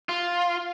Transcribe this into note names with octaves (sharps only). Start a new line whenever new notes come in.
F4